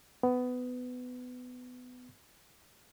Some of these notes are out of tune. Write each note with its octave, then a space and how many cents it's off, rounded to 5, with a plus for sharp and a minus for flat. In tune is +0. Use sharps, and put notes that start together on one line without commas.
B3 +20